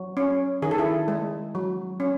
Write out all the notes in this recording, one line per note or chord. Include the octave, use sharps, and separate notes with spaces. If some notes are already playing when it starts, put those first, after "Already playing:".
Already playing: F#3
C#4
D#3 G#4
A4
E4 G#4
G#3
F#3
C#4